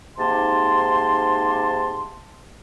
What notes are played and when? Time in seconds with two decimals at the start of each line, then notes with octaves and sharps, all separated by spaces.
0.18 G#2 C3 A#3 D#4 A5 C6